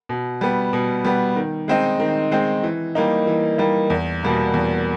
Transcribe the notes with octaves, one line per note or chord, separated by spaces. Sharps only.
B2
G3 B3
B2
G3 B3
D#3
G#3 C4 D#4
D#3
G#3 C4 D#4
E3
G3 A#3 D#4
E3
G3 A#3 D#4
E2
B2 G3 A#3
E2